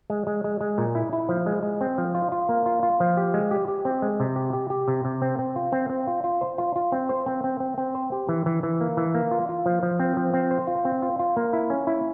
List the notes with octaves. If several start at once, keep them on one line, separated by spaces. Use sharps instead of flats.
G#3
G#3
G#3
G#3
A#2
E4
E4
F3
G#3
G#3
C4
F3
F4
F4
A#3
F4
F4
F3
G4
G#3
G4
G4
C4
G#3
C3
G4
G4
G4
C3
C3
C4
C4
F4
C4
C4
F4
F4
C5
F4
F4
C4
C5
C4
C4
C4
C4
C5
G4
E3
E3
E3
A#3
E3
A#3
F4
F4
F3
F3
C4
F3
C4
C5
F4
C4
F4
F4
A#3
E4
C#4
E4